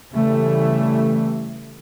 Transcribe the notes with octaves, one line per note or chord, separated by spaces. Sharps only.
C#3 E3 G3 A3